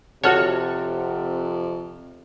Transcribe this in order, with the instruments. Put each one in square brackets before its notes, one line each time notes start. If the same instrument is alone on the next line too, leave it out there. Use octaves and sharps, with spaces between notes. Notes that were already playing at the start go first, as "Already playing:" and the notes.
[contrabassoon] F2 [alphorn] C3 [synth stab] F#4 A4 C#5 [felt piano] F#5 A5 F6